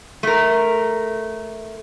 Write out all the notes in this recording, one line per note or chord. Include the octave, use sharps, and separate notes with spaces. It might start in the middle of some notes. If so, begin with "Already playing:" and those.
A3 A#4